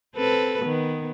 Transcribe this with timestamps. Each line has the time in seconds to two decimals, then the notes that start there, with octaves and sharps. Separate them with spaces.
0.15 C4 A4 B4
0.61 D#3 B3